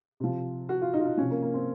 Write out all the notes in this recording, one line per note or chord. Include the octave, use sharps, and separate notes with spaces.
C3 F3
F#4
F4
D#4
F4
D#4
C3 F3 C#4
A#3
A#3
C4